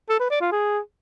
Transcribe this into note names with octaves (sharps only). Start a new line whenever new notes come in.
A4
B4
D5
F4
G#4